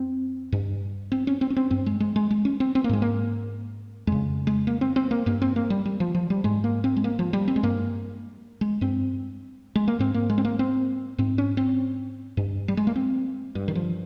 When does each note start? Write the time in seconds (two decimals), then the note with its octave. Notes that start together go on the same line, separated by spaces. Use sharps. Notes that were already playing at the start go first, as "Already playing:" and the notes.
Already playing: F2 C4
0.52 G2
1.12 C4
1.27 C#4
1.41 C4
1.50 C#4
1.56 C4
1.71 G2 C4
1.86 G#3
2.00 G#3
2.16 G#3
2.30 G#3
2.45 C#4
2.60 C4
2.75 C4
2.84 A#3
2.89 G#2 G#3
3.02 A#3
4.07 F2 C#3 G#3
4.47 G#3
4.67 A#3
4.81 C4
4.96 C4
5.11 A#3
5.26 G2 A#3
5.42 C4
5.56 A#3
5.70 G3
5.85 G3
6.00 F3
6.14 F3
6.30 G3
6.44 G#2 G#3
6.64 A#3
6.84 C4
6.96 G#3
7.04 A#3
7.19 F3
7.33 G3
7.48 C4
7.56 G#3
7.63 G2 A#3
8.61 G#3
8.81 G2 C4
9.75 G#3
9.88 A#3
9.99 G#2 C4
10.14 A#3
10.30 G#3
10.38 C4
10.45 A#3
10.59 C4
11.18 G#2 C4
11.38 C#4
11.57 C4
12.37 G2
12.68 G3
12.77 G#3
12.87 A#3
12.96 C4
13.55 G2
13.68 D#3
13.75 F3